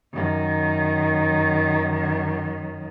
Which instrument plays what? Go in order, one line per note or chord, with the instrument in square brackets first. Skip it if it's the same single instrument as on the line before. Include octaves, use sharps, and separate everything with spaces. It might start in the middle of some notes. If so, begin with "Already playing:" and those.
[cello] F#2 D#3